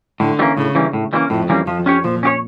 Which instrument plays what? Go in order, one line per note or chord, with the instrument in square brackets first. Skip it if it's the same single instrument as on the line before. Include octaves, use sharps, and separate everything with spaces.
[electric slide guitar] A2 [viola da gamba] D3
[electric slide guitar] E3 G3 A#3 C#4
[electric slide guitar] A2 [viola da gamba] C#3
[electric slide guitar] E3 G3 A#3 C#4
A2
E3 G3 A#3 C#4
[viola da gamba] F2 [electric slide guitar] A2
[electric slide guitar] E3 G3 A#3 C#4
[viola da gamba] F2 [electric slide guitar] F3
[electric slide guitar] C#4 G4 C#5
[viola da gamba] A#2 [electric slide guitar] F3
[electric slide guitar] C#4 G4 C#5